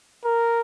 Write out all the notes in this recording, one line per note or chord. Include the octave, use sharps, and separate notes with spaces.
A#4